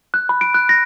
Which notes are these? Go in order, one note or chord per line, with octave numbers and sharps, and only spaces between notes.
F#6
B5
D7
F#6
A#6